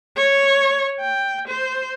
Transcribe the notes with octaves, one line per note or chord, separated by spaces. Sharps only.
C#5
G5
C5